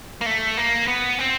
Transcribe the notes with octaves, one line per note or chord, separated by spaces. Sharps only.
A#3
A3
A#3
B3
C4